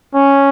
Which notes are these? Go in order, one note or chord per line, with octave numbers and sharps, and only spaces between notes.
C#4